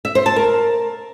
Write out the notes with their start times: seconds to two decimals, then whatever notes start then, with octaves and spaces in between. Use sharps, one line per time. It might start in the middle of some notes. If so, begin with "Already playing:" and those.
0.05 E5
0.15 C5
0.26 A5
0.36 A#4